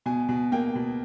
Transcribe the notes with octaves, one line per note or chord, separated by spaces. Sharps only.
B2 G#5
B2
A#3 G5
B2